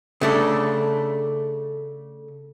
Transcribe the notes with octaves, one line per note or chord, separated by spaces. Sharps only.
C#3 A3 D4